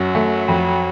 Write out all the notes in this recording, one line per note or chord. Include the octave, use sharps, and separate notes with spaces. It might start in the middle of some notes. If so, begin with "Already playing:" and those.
Already playing: F#2 F#3
A3
F2